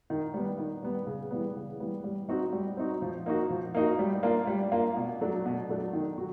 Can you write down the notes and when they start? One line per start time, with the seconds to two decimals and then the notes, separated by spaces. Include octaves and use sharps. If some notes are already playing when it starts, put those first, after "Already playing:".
0.10 D#3
0.34 G3 B3
0.58 D#3
0.83 G3 B3
1.07 C#3
1.31 E3 G3 B3
1.55 C#3
1.80 E3 G3 B3
2.04 G3
2.29 C4 D#4 F#4
2.53 G3
2.77 C4 D#4 F#4
3.02 F3
3.26 A#3 D#4 F#4
3.50 F3
3.75 A#3 D#4 F#4
3.99 G3
4.23 A#3 D4 F4
4.47 G3
4.72 A#3 D4 F4
4.96 B2
5.21 F#3 A3 D4
5.46 B2
5.69 F#3 A3 D4
5.94 D#3
6.18 F#3 F#4